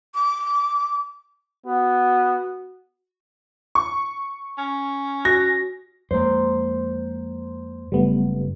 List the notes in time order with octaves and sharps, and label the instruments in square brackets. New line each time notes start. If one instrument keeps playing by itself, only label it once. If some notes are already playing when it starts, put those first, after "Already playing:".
[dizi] D6
[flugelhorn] B3 [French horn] F#4
[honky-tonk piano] C#6
[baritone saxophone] C#4
[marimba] F#4 [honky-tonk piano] A#6
[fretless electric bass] F2 G#3 [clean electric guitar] A#3 C5
[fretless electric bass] F#1 [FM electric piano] G3 A3 B3